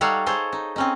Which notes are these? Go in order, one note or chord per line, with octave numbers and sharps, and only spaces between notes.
G3 D#4 A4 C#5 F5 F#5
G#4 A4 C5 C#5
D#4
C4 C#4 D#4